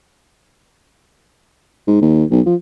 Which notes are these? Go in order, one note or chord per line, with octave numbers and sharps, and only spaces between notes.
G#2
D#2
B1
F3